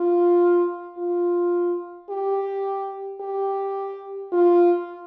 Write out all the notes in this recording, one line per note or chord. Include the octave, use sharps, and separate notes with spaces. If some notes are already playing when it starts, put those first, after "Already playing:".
Already playing: F4
F4
G4
G4
F4